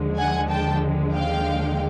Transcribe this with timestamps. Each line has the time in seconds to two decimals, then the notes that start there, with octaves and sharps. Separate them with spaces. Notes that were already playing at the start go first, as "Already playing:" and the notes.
Already playing: D#2 D3 F3 G#3
0.18 F#5 G#5
0.49 G5 A5
1.13 F5 G5